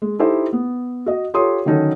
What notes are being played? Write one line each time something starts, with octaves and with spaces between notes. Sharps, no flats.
G#3
D#4 E4 G4 A4 C5
B3
F#4 D#5
F4 G4 A4 C#5 C6 D#6
D3 D#3 F#3 C#4 D#4 A4